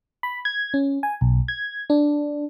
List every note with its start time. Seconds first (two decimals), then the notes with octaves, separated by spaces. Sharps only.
0.23 B5
0.45 G#6
0.74 C#4
1.03 G#5
1.21 B1
1.48 G#6
1.90 D4